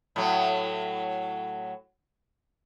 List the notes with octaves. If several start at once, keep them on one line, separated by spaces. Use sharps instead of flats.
A2 F#3